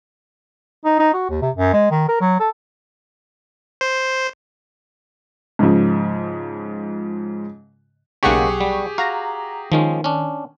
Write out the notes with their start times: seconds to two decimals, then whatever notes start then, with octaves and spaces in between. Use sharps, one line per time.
0.85 D#4
0.99 D#4
1.13 F#4
1.29 D#2
1.41 C3
1.56 F#2
1.73 G#3
1.91 D#3
2.08 A#4
2.21 F#3
2.39 A4
3.81 C5
5.59 G#2 C#3 F3
8.23 B1 C#3 G#3 A#3 G4 G#4 F#5 C#6
8.61 G3
8.98 F#4 F5 A#5
9.72 D#3 F3 G#3 C#4
10.04 C#4 D4